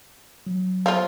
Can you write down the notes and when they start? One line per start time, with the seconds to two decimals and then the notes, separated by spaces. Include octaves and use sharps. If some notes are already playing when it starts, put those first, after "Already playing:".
0.46 F#3
0.86 F3 F4